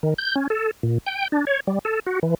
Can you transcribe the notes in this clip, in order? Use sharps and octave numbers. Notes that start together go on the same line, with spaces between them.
D#3
G6
C#4
A4
A#2
G5
D4
C#5
G3
A4
F#4
E3